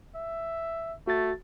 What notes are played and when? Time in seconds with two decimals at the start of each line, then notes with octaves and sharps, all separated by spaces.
0.16 E5
1.07 A3 F#4 A6